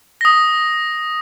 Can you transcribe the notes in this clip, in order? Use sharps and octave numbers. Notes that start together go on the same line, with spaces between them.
D#6 A#6